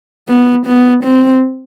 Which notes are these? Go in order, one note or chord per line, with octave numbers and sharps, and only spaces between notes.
B3
B3
C4